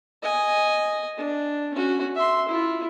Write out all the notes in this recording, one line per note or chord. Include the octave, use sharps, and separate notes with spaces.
D#5 G#5
D4
C#4 F#4
E5 C6
E4 F4